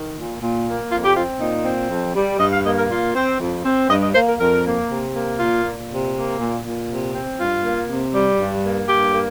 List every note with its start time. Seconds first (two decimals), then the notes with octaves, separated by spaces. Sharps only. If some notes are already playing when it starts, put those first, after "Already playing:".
Already playing: D#3
0.16 A#2
0.40 A#2
0.65 A#3
0.90 F2 F4
1.04 G4
1.15 C4 F4
1.40 A#2 D#4
1.64 C4
1.90 F2
2.15 G3
2.40 G2 D#5
2.53 F5
2.64 A#3 D#5
2.78 A#4
2.89 A#2 F4
3.15 C4
3.39 F2
3.64 C4
3.89 G2 D#5
4.02 D#5
4.14 A#3 C5
4.27 A#4
4.40 F2 A#4
4.65 A#3
4.90 C3
5.14 A#3
5.39 A#2 F4
5.64 A#2
5.89 C3
6.15 A#3
6.39 A#2
6.64 A#2
6.90 C3
7.13 C4
7.38 G2 F4
7.63 A#3
7.88 C3
8.14 G3
8.39 G2
8.64 A#3
8.88 G2 G4
9.13 A#3